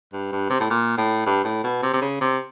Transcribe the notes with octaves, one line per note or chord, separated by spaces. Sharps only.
G2
G2
C3
A2
A#2
A2
G2
A2
B2
C3
C3
C#3
C3